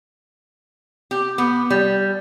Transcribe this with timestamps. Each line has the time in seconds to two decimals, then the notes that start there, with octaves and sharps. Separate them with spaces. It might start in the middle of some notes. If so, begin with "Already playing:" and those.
1.11 G4
1.38 B3
1.70 G3